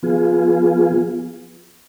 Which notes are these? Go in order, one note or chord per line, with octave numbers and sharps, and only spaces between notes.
F3 B3 F4 G#4